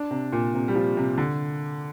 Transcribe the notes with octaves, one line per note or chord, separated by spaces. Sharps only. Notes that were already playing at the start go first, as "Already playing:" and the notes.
Already playing: D4
C3
A#2
C3
G3
F3
C3
D3